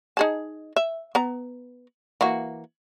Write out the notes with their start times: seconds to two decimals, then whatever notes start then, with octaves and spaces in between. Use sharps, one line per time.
0.17 D#4 G#4 A5
0.76 E5
1.15 B3 A#5
2.21 E3 A#3 F#4